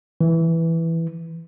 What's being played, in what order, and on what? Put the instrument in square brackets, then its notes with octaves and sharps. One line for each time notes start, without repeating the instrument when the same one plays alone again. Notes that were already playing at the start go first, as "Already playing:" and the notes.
[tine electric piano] E3